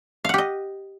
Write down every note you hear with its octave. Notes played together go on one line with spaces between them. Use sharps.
G4 D#5 F5 F#5